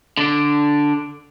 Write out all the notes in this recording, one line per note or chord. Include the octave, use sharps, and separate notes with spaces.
D3 D4